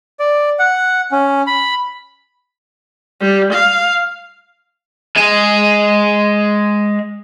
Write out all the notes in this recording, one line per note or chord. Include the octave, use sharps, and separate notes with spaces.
D5
F#5
C#4
B5
G3
F5
G#3 G#4